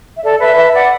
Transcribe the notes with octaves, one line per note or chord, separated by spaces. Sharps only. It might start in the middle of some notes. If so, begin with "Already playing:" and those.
E5
A4 D5
B4 E5
B4 E5
D5 F#5